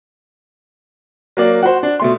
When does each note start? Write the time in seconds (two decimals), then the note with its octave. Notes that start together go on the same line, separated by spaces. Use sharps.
1.37 F#3 A#3 D5
1.63 F#4 C5
1.83 D4
2.00 B2 A3 C6